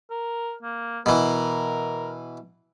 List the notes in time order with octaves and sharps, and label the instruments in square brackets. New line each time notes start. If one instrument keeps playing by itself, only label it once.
[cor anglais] A#4
A#3
[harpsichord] B2 E3 [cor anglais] A#4